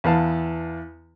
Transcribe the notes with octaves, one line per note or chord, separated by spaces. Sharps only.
E2 B3 F5 A5